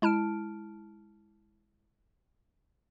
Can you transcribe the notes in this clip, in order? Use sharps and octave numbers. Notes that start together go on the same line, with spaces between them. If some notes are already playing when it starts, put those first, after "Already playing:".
G#3 E4 A5 F6 D7